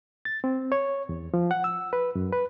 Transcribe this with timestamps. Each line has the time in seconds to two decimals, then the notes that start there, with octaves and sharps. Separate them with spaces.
0.25 A6
0.44 C4
0.72 C#5
1.09 E2
1.34 F3
1.51 F#5
1.64 E6
1.93 B4
2.15 F#2
2.33 B4